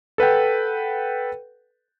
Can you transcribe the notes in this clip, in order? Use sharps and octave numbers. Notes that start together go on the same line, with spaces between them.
A4 B4 F#5 G5